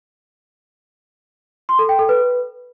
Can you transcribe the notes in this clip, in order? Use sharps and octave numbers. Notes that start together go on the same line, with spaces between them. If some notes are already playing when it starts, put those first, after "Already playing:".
C6
A4
G5
A4
B4